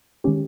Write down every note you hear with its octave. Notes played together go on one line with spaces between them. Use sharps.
D#3 G#3 C#4 G4